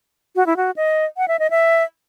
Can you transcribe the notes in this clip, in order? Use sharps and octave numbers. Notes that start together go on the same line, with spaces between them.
F#4
E4
F#4
D#5
F#5
E5
D#5
E5